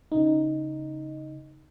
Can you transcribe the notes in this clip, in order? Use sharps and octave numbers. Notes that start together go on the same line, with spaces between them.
C#3 D#4